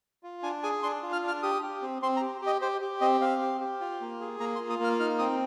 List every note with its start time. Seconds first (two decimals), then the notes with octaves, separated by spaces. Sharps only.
0.23 F4
0.43 D4 G#5
0.63 G#4 G#5
0.83 D4 C6
1.03 F4
1.13 F6
1.23 D4
1.28 F6
1.43 G4 D#6
1.62 G4
1.82 C4
2.02 C4 C6
2.17 A#5
2.21 G4
2.41 G4
2.47 D#5
2.62 G4 C5
2.81 G4
3.01 C4 D#5
3.21 C4 F5
3.41 G4
3.60 G4
3.81 F4
4.01 A#3
4.21 G#4
4.40 A#3 A#5
4.55 C6
4.60 F4
4.70 D#6
4.79 A#3 F6
4.99 D#4 F6
5.19 C4 D#6